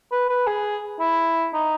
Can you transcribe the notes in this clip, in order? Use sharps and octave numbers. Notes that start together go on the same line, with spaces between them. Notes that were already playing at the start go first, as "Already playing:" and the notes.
B4
B4
G#4
E4
D#4